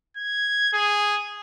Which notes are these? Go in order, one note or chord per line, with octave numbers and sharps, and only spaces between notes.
G#6
G#4